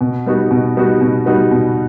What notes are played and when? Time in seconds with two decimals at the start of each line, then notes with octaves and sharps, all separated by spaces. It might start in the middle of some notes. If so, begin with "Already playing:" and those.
0.01 B2
0.26 G3 B3 D#4 F#4
0.51 B2
0.77 G3 B3 D#4 F#4
1.01 B2
1.26 G3 B3 D#4 F#4
1.51 B2